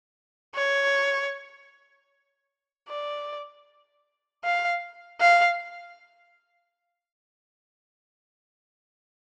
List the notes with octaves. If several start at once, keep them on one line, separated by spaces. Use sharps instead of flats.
C#5
D5
F5
F5